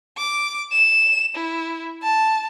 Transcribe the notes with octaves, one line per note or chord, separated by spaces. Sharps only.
D6
E7
E4
A5